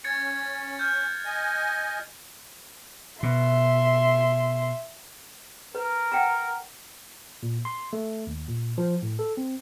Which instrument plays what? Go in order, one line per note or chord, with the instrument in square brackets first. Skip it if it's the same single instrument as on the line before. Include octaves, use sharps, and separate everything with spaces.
[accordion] C#4 [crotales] G#6 A6 C#7
[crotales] F6 G6
[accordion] D#5 G#5
[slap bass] B2 [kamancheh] E5 C6
[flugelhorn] A#4 [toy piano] B4
[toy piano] F#5 G5 A#5
[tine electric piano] A#2
C6
A3
D#2
A#2
F3
A2
A4
C4